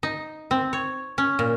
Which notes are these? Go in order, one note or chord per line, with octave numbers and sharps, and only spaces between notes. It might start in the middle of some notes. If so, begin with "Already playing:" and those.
D#4
C4
C#5
C#4
A#2